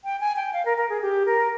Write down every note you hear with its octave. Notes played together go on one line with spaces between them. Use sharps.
G5
G#5
G5
F5
A#4
A#4
G#4
G4
A#4